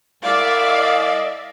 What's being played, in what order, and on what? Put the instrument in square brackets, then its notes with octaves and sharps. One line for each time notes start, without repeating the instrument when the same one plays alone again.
[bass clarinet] C2 [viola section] D5 E5 [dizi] F5
[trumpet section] D#5